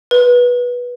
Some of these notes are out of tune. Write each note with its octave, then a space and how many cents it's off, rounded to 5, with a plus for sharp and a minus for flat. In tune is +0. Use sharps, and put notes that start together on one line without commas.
B4 -15